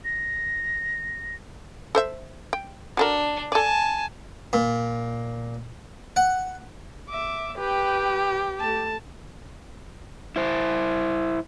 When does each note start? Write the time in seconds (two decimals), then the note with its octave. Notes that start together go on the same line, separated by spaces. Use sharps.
0.05 A#6
1.95 A4 C5 E5
2.53 G5
2.97 D4 F#4 A4 A#4
3.52 A4 D5 G#5 A5
4.53 A#2
6.16 F#5
7.09 E5 D6
7.58 G4 B4 G5
8.60 A3 A5
10.36 E4 C5